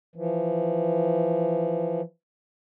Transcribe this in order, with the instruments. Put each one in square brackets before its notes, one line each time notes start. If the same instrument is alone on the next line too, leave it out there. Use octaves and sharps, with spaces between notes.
[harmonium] E3 F3